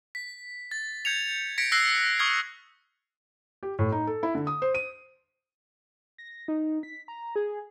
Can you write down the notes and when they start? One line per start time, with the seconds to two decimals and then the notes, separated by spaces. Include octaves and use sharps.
0.15 B6
0.71 A6
1.05 G6 G#6 C#7 F7
1.58 G#6 A#6 B6 C#7 D7
1.72 E6 F#6 A#6 C7
2.19 C#6 D#6 F6 G#6
3.63 G4
3.79 A2
3.92 D#4
4.07 A4
4.23 E4
4.35 D3
4.47 D#6
4.62 C5
4.74 D#7
6.18 A#6
6.48 D#4
6.83 B6
7.08 A#5
7.36 G#4